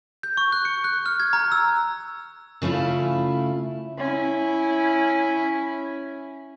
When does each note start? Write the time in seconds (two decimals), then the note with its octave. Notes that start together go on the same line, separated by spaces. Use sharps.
0.23 G6
0.37 C#6
0.52 F#6
0.65 C#7
0.84 F#6
1.06 F6
1.20 G#6
1.33 A#5
1.52 E6
2.62 C#3 A3 C#4 E4 F4
3.98 C#4 E4